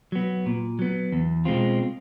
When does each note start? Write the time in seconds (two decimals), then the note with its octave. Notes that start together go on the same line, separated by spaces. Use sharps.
0.12 F#3 B3
0.46 A#2
0.79 F#3 B3
1.12 E2
1.45 B2 G#3 C4 F4